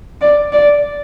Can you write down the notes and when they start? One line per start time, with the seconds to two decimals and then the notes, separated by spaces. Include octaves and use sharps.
0.21 D5
0.53 D5